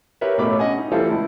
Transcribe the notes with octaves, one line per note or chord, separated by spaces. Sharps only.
G4 A#4 B4 C#5 E5
A1 B2 A3 C#5 B5 D6
C#4 D#5 F#5 G#5
D#4
E3 G3 A3 F4 A4 C5
C#2 E4